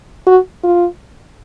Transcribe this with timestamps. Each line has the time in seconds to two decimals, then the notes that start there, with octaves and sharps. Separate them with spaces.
0.27 F#4
0.64 F4